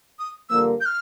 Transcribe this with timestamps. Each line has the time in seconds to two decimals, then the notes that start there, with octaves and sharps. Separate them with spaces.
0.19 D#6
0.50 G2 D3 F3 A#3 E6
0.81 G6
0.86 F6